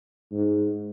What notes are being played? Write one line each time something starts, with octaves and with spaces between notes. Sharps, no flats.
G#2